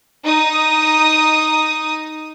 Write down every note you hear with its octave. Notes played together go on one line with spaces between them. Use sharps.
D#4 D#6